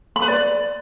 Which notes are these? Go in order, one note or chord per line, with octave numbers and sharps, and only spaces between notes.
B5
B4
D5